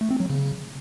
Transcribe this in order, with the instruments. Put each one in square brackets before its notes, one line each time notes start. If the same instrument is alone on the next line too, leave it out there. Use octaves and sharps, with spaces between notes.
[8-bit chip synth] A3
C4
F#3
C#3